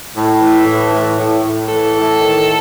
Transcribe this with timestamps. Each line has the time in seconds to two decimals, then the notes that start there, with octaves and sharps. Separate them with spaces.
0.14 A2
0.40 E3
0.66 A2
0.92 A2
1.17 A2
1.43 A2
1.69 E3 A4
1.95 A2
2.21 D#3